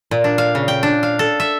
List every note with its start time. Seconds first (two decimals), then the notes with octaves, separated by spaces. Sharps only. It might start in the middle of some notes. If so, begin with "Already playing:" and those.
0.11 A#2
0.24 D4
0.38 F5
0.55 C#3
0.68 G5
0.83 D4
1.03 F5
1.19 A4
1.40 E5